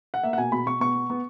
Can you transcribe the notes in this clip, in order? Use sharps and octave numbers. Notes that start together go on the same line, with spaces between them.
F#5
A#3 E5
F#5
B2 G#5
B2 B5
B2 C#6
B3 C#6
B3
B3